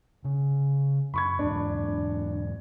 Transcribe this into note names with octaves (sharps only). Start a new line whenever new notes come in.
C#3
F#2 B5 C#6 G#6
E2 G#2 D4